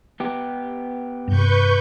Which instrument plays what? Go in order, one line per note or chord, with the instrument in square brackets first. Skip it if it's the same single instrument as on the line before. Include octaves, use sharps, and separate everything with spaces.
[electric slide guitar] B3 G4
[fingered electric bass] G2 C3 [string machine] B4 C#6 G6